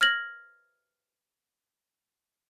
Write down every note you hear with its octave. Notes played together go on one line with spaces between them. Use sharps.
F6 G#6 A#6 F#7